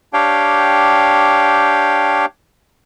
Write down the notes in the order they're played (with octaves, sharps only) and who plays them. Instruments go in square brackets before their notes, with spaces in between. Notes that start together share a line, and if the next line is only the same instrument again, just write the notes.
[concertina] D4 G4 C#5 F5 G5